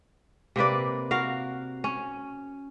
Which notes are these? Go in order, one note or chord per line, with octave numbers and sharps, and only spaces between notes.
C3 A#3 B4 D5
F#4 A#4 F5
C#4